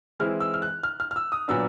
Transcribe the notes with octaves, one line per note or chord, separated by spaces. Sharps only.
E3 G#3 C4 E4 F6
E6
F6
F#6
F6
F6
F6
E6
D#6
A#2 F#3 B3 D4 E6